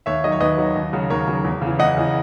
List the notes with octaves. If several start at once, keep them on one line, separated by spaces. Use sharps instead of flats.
D#2 C#5 E5
D#3 F#3 D#5
C#5
D#2 B4 D#5
D#3 F#3
D#2
C#3 F#3
D#2 A#4 C#5
C#3 F#3
E2
C#3 E3
E2 D#5 F#5
C#3 E3